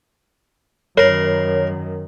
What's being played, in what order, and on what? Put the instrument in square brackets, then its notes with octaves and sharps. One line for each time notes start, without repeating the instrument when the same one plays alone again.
[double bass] F#2 D#3 [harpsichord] A#4 [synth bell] C#5